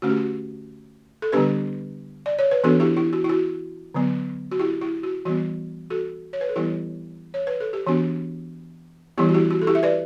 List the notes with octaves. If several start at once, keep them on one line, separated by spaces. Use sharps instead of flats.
D3 A3 C#4 F#4
G4
F#4
A4
D3 G3 B3 D4 G4 B4
D5
C#5
B4
E3 B3 D4 F#4 A4
E4 G4
E4
F#4
E4
F#4
D3 F#3 B3
F#4
E4 G4
E4
F#4
E3 G3 B3 F#4
F#4 A4
C#5
B4
A4
E3 G3 B3 E4 G4
C#5
B4
A4
G4
E3 B3 D4 F#4
E3 G3 B3 E4 G4
F#4
E4 G4
F#4
A4
E4 G4
E5
B4 D5